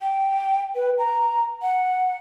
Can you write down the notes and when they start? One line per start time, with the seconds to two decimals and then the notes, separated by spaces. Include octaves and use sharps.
0.01 G5
0.76 B4
0.99 A#5
1.63 F#5